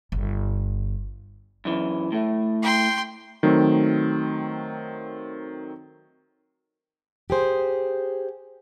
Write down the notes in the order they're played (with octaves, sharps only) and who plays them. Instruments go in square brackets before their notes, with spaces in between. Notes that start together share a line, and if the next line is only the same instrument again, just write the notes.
[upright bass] G1
[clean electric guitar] F#2 E3
A2 A3
[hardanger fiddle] G5 C6
[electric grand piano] D#3 F#3 A3 C4
[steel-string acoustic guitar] G4 G#4 C5